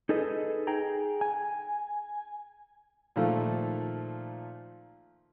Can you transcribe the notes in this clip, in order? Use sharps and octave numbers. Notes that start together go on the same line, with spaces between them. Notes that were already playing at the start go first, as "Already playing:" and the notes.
D#4 G#4 A4 B4 D#5
G#4 G5 A#5
G#5
A#2 D#3 F3 A3